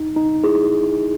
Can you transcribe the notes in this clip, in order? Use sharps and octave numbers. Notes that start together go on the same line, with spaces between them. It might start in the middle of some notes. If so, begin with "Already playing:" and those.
Already playing: D#4
D#4
E4 G#4